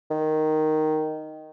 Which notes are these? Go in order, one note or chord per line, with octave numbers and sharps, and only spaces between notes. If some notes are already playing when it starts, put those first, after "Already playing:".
D#3